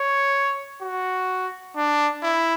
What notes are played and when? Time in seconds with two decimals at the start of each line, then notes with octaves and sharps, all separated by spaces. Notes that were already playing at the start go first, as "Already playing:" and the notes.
Already playing: C#5
0.82 F#4
1.77 D4
2.23 E4